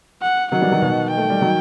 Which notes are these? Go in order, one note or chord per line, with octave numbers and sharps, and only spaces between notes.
F#5
D#3 F#3 F#5
E3 G3
D#3 F#3
B2 D#3
G5
A3
G3
D#3 F#3